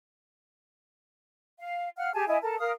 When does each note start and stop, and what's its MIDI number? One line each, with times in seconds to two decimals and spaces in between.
1.59 1.89 77
1.97 2.13 77
1.97 2.13 78
1.97 2.13 89
2.13 2.25 67
2.13 2.25 68
2.13 2.25 80
2.13 2.25 81
2.28 2.38 64
2.28 2.38 75
2.28 2.38 80
2.42 2.58 69
2.42 2.58 70
2.42 2.58 81
2.60 2.71 70
2.60 2.71 77
2.60 2.71 87
2.60 2.71 89